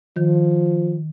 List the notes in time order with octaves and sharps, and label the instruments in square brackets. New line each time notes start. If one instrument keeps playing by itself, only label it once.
[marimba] D#3 [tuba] F3